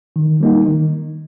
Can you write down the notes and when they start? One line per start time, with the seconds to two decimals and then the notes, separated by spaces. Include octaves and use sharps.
0.16 D#3
0.41 G3 A#3 D#4
0.66 D#3